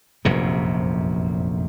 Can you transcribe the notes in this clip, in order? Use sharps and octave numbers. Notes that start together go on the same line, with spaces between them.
F1 A#1 F#2 C3